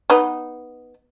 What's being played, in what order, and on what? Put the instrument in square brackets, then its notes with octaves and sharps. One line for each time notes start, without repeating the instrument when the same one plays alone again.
[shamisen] B3 D#4 B4